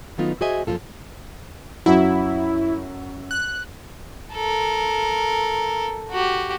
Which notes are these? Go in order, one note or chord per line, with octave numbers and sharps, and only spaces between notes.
D#3 F#3 A3 B3 D#4 F4
F#4 G#4 C5 D#5 E5 G#5
F#2 F3 F#3 A#3 F4 A4
F#2 F#3 E4
F#6
A4 A#4
F#4 G4